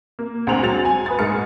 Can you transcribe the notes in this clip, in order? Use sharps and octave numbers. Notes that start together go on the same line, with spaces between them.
A#3
D2 C4 G#4 A#5 F7 F#7
F#3 G#3 A6 C#7 F7
G#5
B4 D#6 A6
G#2 G#4 A#4 F6 C#7